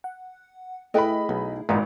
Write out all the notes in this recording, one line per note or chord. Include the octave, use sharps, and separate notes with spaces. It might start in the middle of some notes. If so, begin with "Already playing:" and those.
F#5
A3 E4 G#4 A4 B4 D#5 G5 B5
B1 D#4
G#1 A#2 B3 D#4 E4 D5